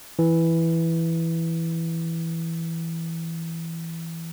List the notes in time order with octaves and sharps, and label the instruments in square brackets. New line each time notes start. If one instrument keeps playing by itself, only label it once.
[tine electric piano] E3